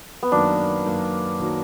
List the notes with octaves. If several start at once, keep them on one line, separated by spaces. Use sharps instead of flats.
B3
F#2 D#3 F#3 A#3 D4
F#2 D#3 F#3 A#3
D#3 F#3 A#3